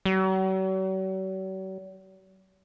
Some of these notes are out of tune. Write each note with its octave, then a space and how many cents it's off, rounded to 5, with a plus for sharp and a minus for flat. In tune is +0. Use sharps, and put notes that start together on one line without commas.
F#3 +45